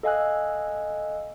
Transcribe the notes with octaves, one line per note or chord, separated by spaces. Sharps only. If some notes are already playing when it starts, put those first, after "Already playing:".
A4 D#5 F5 G#5 E6 F#6